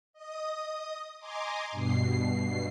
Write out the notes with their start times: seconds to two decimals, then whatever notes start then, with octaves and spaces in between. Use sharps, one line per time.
0.13 D#5 D#6
1.18 D#5 G#5 A#5 C6 D6
1.71 G2 B2 C7